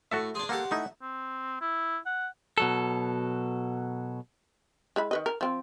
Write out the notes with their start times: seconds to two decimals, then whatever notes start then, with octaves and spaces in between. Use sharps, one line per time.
0.12 A2 F#4 A4 E5
0.35 D4 G#4 C6
0.49 A#3 G4 A4 C5 F#5
0.71 A3 D#4 E4 E5
1.02 C4
1.61 E4
2.06 F#5
2.58 B2 F#3 A4
4.96 G#3 E4 B5
5.11 D#3 B4 D#5
5.26 A#4
5.41 F3 C4